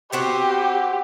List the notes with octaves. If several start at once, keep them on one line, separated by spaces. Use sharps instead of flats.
B3 C4 F#4 G4